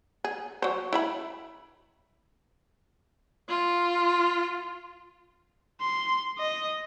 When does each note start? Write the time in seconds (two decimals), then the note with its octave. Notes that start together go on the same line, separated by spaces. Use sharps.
0.24 G#4
0.62 F#3 C5
0.93 E4 E5 B5
3.49 F4
5.80 C6
6.38 D#5